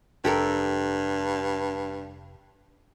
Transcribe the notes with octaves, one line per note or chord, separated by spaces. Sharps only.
F1 G2 G4 A4 A#4